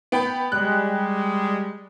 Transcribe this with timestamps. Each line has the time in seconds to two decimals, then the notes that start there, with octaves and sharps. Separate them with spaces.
0.12 B3 G5 B5
0.52 G3 G#3 F#6